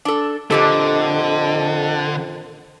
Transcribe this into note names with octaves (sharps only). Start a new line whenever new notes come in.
D4 A4
F2 A#2 D3 G4 A4 D#5